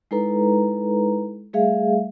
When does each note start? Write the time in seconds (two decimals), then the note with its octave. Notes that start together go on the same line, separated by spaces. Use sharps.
0.11 G#3 D#4 E4 A4 B4 A#5
1.53 G3 A3 G#4 E5 F5